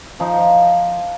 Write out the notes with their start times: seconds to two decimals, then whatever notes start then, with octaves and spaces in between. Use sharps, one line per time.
0.20 F3 D#4
0.38 F3